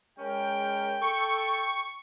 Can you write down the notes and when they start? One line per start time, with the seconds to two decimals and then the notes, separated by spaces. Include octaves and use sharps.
0.18 G#3 C#4 A#4 G5
1.01 A4 C#6